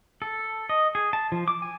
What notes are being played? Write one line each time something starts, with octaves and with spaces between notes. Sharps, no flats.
A4
D#5
G#4
A5
F3
D6
G#5